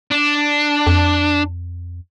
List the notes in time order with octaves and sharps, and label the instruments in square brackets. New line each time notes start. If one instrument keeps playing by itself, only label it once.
[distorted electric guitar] D4
[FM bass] F2